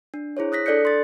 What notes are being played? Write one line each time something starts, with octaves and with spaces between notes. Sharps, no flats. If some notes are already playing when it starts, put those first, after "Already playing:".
D4
E4 G#4 C5 C#5
D#6 F#6 A#6 B6
D4 A4 D5 F#6 G6 C#7
C6 A6